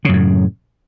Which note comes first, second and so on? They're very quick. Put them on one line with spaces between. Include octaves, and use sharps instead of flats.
C#3 F#2 A2